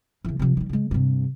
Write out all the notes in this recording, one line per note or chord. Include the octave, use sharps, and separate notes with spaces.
C#3 E3
C3 F3
D#3 G3
C#3 G#3
G2 C3